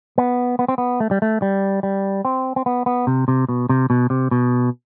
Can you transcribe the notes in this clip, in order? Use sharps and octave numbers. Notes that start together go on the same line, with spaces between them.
B3
B3
C4
B3
A3
G3
A3
G3
G3
C4
C4
B3
B3
C3
C3
B2
C3
B2
C3
B2